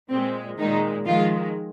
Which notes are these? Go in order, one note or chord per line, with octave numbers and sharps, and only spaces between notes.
A#2 G#3 C4
A#2 D#3 G#3 D#4
D#3 F3 G#3 F4